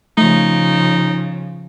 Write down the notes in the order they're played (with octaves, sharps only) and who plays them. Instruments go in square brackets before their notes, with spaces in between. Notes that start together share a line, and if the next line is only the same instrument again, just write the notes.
[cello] C#3 F3 [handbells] A3 [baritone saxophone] D#4